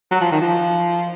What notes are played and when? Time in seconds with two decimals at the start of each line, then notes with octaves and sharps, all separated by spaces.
0.11 F#3
0.21 F3
0.32 D#3
0.41 F3